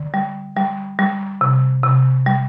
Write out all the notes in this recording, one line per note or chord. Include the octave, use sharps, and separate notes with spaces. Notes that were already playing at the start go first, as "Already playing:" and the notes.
Already playing: D3
G3
G3
G3
C3
C3
G3